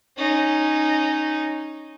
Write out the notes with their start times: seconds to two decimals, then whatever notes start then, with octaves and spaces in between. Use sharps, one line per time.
0.17 C#4 D#4